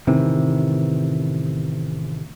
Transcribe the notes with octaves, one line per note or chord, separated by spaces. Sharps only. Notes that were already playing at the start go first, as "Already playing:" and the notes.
A1 C3 D#3 E3